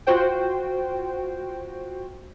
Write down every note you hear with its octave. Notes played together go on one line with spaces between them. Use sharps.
F4 F#4 C5 G5